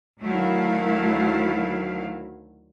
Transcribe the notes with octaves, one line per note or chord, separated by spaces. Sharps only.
D2 D#3 F#3 A3 E4 F5